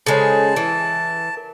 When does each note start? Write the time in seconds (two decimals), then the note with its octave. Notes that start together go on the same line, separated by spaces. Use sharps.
0.07 C#3 G#3 A4 C5 C#5 A5
0.56 E3 D7
1.37 A#4